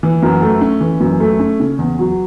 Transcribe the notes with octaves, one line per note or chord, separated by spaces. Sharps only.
E3
F#2
A3
C#4
E3
F#2
A3
C#4
C#3
E2
F#3